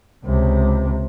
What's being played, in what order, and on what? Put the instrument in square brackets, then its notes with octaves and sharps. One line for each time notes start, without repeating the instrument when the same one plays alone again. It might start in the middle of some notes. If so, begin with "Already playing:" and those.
[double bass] C#2 C3